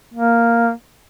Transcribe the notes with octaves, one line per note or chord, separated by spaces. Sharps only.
A#3